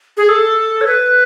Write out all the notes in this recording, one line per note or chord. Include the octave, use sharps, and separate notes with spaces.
G#4
A4
C#5
B4